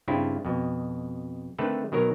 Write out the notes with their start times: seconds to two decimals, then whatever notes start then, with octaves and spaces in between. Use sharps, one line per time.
0.08 G2 C#3 C4 D4 E4 F4
0.45 F2 B2
1.58 D3 D#3 A3 C4 A4 B4
1.92 B2 D#3 F#3 A#4 C#5